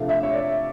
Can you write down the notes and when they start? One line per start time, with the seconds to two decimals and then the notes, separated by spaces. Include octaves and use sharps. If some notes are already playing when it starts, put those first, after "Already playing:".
Already playing: C3 F3 A3 D4 F5
0.09 E5
0.23 C#5
0.34 D5